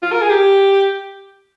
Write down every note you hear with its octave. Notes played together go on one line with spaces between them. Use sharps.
F4
A#4
G#4
G4